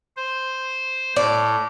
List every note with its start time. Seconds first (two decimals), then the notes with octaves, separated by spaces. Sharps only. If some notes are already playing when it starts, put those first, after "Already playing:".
0.17 C5
1.16 A2 D5